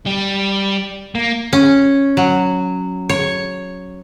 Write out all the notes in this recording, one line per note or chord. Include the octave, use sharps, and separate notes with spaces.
G3
A#3
C#4
F#3
C#5